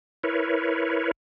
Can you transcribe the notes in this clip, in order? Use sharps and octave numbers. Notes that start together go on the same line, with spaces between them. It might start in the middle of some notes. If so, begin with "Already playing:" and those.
E4 A#4 B4 C#5